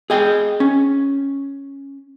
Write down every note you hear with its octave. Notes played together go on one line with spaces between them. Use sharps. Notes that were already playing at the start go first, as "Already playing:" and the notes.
G#4 D#5 G5
C#4